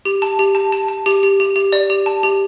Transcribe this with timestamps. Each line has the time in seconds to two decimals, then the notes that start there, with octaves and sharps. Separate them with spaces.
0.05 G4
0.22 A5
0.39 G4
0.55 A5
0.72 A5
0.88 A5
1.06 G4
1.23 G4
1.40 G4
1.56 G4
1.73 D5
1.90 G4
2.06 A5
2.23 G4